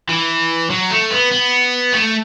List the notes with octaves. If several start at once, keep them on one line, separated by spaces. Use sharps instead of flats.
E3
F#3
A3
B3
B3
A3